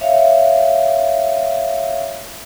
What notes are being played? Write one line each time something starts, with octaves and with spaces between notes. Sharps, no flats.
C#5 E5 F5